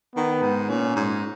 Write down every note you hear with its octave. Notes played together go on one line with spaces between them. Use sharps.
D#3 B3
G#2
A#2 C#4
G#2